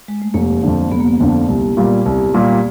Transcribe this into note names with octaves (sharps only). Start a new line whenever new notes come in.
G#3
A3
F1 A#3
F2 D3
F1 B3
A#3
B3
F2 D3
C2
A#2 G3 A#3
C2
A#2 G3 A#3